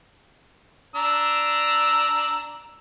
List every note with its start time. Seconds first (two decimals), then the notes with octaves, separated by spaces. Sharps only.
0.95 D4 A#5 E6